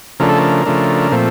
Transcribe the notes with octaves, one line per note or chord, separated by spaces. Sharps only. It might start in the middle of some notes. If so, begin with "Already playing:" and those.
C#3 F3 A3 D4 A#4
A4
A#4
C#3 F3 A3 D4
A#2 F3 A3 C4